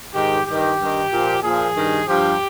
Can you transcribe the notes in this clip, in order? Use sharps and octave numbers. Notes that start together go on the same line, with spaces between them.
G#2 D#3 G4
G2 D#3 G4
G2
D#3
A#2 F3
A#2 F3 G#4
G2 D#3
G2 F3 G4